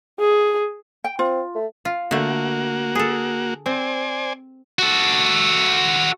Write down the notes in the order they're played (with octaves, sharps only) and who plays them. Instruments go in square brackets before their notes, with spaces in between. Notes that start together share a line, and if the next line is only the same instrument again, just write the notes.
[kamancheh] G#4
[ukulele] G5
[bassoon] C4 [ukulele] F4
[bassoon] A3
[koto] F4
[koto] D3 A3 [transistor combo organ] A#3 F#4
[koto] G#4 A4
[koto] C4 [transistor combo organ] C5 D5 G#5
[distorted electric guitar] F#4 A4